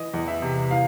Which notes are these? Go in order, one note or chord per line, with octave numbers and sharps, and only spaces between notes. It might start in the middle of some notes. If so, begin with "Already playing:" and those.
Already playing: E3 D#5
E2
E5
C3
E3 F5